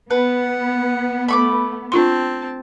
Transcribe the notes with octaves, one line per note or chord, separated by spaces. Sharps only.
B3 B4 F#5
A3 B5 C#6 D6
C4 D4 F4 A5 C6